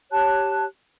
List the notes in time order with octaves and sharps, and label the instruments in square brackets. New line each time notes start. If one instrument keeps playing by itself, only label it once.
[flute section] G4 C#5 A5 F#6